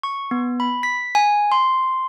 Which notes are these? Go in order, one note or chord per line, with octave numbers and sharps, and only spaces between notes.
C#6
B3
B5
B6
G#5
C6